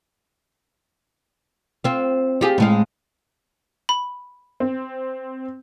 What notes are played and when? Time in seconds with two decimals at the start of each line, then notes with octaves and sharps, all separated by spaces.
1.84 C4 F4
2.41 F4 G4 G#4
2.58 A2 G#3 F5
3.89 B5
4.60 C4